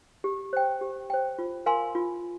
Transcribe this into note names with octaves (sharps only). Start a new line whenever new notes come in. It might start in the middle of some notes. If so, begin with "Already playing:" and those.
G4
C5 G5
G4
C5 G5
F4
A#4 F5 G#5 C6
F4